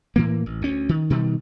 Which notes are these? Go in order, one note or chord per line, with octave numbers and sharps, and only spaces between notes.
A2 E3 A#3
A1
D2 C#4
D#3
B2 D#3 G3